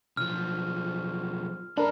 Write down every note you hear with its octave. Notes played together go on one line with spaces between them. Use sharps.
B1 F3 F6
F#2 D4 A#4 B5